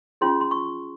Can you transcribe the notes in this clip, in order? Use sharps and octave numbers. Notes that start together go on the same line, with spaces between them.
C#4 F4 G#4 C#5 C6
C6
C#6